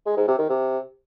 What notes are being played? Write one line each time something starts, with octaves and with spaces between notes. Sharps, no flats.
G#3
G#2
C3
D#3
C3